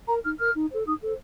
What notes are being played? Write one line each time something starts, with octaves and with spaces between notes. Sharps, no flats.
A#4 A#5
D#4 F6
A#4 F6
D#4
A4 C5
D#4 D#6
A4 C5